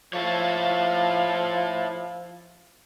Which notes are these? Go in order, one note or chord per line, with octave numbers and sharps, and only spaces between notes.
F3 E4 A4 C#5 F5